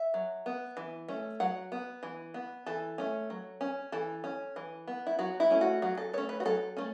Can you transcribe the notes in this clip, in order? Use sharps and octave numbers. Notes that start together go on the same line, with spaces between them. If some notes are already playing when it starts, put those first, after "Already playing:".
Already playing: E5
F#3
B3
E3
A3 C#4
F#3 F#5
B3
E3
B3
E3 A4
A3 C#4
F#3
C#4
E3 A4
C#4
E3
B3
E4
F#3 F#4
E4
A3 C#4
F#4
F#3 F#4
A4
A3 C#4 C#5
B4
F#4
F#3 A4
A3 C#4